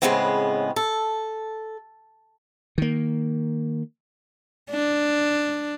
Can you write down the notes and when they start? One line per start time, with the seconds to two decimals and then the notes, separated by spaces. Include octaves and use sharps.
0.02 A2 C#3 F#3 G#3 B3 C4
0.76 A4
2.78 D#3 A#3
4.71 D4